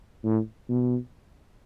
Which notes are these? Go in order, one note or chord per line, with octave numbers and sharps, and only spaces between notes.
A2
B2